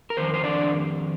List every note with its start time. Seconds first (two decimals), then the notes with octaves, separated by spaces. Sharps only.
0.10 A#4
0.17 F2 D#3 C5
0.34 C5
0.44 D4 D5